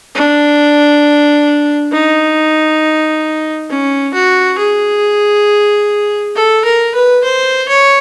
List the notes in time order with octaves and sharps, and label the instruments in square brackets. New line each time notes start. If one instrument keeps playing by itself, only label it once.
[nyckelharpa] D4
D#4
C#4
F#4
G#4
A4
A#4
B4
C5
C#5